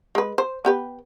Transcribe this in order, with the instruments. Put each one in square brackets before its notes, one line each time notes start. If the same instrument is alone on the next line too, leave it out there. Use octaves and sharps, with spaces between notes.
[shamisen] G#3 B4
C5
B3 G4 B4